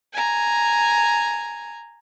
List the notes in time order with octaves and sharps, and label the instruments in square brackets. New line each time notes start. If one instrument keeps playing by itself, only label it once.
[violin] G#5 A#5